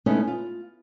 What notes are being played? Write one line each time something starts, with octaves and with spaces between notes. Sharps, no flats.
G#3 A3 B3 C#4 D#4 E4
F4